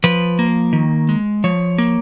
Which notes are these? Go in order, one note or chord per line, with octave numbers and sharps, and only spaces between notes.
F3 B4
A#3
D#3
G#3
F3 C#5
A#3